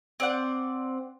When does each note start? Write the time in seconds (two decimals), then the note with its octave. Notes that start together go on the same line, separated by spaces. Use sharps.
0.20 C4 D5 F#5